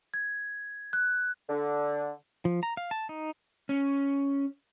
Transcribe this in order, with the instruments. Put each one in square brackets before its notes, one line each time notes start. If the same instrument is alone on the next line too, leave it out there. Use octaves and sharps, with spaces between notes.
[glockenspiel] G#6
F#6
[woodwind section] D3
[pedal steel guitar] F3
A#5
F5
A5
D#4
[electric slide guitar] C#4